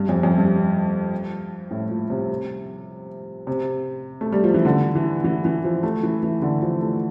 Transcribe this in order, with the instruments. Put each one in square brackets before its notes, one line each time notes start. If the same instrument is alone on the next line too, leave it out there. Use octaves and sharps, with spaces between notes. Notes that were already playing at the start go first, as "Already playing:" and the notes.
Already playing: [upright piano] G2
F2
F2
G2
A2
A#2
C3
C3
A3
G3
F3
E3
D3
E3
E3
E3
F3
A3
E3
E3
D3
F3
A3